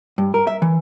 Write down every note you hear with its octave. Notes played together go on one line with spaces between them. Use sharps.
G2
A#4
E5
E3